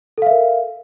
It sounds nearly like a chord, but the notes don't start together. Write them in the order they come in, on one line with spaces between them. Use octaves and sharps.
A4 F5 E5 A#4